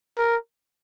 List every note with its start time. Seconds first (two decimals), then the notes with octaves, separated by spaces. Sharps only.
0.18 A#4